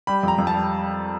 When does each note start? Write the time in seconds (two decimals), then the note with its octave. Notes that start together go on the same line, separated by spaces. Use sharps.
0.07 G3 B5
0.23 F2
0.28 A#5
0.38 F2
0.47 A5
0.53 G3